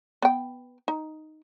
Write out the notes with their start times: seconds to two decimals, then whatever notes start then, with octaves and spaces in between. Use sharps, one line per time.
0.22 B3 G5
0.88 D#4